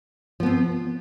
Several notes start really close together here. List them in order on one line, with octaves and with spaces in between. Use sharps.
F3 B3 C4